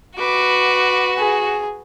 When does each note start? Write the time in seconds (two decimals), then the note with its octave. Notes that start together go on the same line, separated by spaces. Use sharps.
0.19 F#4 B4 D6
1.18 G#4